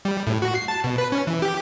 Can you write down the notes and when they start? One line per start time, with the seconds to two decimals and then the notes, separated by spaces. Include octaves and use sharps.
0.05 G3
0.27 A2
0.42 F#4
0.55 C7
0.68 A5
0.84 B2
0.98 B4
1.12 C#4
1.27 E3
1.42 G4